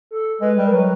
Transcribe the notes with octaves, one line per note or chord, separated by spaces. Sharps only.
A4
G#3 B4
G3
A#4
F#3 B4